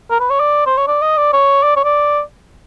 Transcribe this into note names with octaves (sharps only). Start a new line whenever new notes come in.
A#4
B4
C#5
D5
C5
C#5
D5
D#5
D5
C#5
D5
C#5
D5